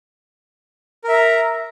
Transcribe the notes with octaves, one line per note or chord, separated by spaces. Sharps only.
A#4 E5 A#5